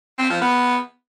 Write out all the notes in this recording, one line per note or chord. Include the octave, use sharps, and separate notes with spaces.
C4
F3
B3